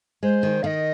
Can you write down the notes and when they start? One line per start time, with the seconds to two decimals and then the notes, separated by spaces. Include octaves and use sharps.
0.23 G#3 C5
0.43 D#3
0.63 D#3 D#5 F5